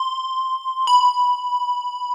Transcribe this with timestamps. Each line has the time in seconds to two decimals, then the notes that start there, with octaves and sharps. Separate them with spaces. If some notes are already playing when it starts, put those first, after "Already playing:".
Already playing: C6
0.87 B5